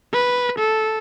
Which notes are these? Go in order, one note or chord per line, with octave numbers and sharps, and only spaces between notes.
B4
A4